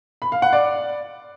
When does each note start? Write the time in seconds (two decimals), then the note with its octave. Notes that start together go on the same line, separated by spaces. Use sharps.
0.22 B5
0.32 F5
0.42 F#5
0.53 D5